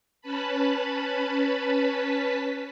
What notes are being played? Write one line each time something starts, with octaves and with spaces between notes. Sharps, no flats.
C#4 B4 A5 B5